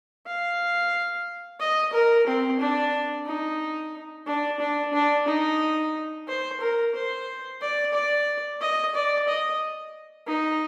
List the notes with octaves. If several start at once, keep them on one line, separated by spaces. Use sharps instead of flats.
F5
D#5
A#4
C4
D4
D#4
D4
D4
D4
D#4
C5
A#4
C5
D5
D5
D#5
D5
D#5
D#4